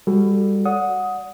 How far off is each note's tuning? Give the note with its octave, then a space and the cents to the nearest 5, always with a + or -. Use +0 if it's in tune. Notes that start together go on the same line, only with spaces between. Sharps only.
G3 +25 F#4 +0 A4 +5
D5 -25 F#5 -15 D#6 +15